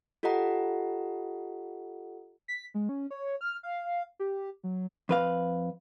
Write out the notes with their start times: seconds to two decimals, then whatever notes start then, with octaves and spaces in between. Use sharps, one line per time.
0.23 F4 G4 A4 D#5 F#5 A#5
2.48 B6
2.74 G#3
2.89 C#4
3.11 C#5
3.41 F6
3.63 F5
4.20 G4
4.64 F#3
5.09 F2 B4 F5